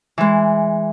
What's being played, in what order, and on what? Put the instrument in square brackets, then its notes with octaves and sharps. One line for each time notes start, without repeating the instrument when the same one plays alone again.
[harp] E3 G#3